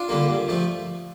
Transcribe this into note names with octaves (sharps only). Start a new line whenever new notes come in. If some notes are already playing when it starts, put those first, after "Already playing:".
Already playing: D4 F4
D3 G3 A#3
G2
F3 A3